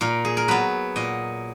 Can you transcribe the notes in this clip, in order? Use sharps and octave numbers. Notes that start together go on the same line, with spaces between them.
A#2 A#4
G#4
A#4
F#3 B3 B4
A#2 D#5